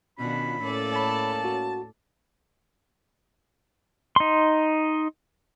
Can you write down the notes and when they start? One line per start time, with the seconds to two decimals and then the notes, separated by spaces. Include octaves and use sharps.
0.18 B2 D#3 C#4 D4 F4 B5
0.62 A2 A#3 C#4 A4 D5
0.93 C#5 A5 B5
1.45 F#4
4.16 D#4 C6